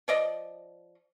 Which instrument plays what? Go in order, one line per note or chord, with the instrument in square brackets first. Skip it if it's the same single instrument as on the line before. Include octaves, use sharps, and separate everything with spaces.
[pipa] F3 D5 D#5